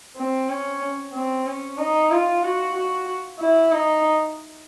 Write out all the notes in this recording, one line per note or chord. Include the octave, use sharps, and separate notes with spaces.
C4
C#4
C4
C#4
D#4
F4
F#4
F#4
E4
D#4